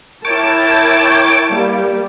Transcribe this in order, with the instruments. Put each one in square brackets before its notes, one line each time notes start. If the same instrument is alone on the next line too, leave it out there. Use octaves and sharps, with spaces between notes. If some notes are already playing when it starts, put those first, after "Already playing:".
[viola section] E4 A#4 A5 [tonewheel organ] C#5 G5 D6
[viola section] G3 [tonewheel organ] A#3